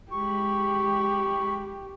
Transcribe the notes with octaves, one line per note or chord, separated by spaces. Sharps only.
G#3 G4 B5 C#6